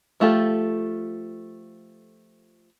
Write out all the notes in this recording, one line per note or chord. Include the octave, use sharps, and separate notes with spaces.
F3 A3 F4 G4 A4